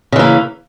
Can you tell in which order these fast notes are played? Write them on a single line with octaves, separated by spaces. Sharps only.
C#3 E3 A#3